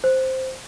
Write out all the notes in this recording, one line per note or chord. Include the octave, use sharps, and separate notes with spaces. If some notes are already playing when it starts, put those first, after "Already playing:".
C5